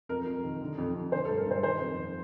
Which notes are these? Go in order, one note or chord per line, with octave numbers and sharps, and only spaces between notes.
F2 A#4
F2
D#3
D3
F2
F2
D3 C5
A4
G2
A#4
G2 C5
D#3 C5
F2
F2